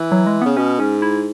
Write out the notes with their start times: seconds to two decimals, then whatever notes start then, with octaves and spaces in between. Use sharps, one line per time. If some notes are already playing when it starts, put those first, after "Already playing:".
Already playing: E3
0.12 F#3
0.27 G#3
0.42 C#3 B3
0.57 B2 C#4
0.80 G#2 C#4
1.02 E4